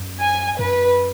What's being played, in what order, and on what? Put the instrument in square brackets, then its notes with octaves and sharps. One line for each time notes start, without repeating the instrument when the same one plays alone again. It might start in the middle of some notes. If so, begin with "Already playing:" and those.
Already playing: [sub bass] F#2
[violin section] G#5
[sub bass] F#2 [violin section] B4